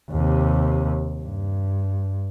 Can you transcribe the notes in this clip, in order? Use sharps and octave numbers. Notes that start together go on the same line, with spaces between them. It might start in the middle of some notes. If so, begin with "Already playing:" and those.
D#2 C3
G2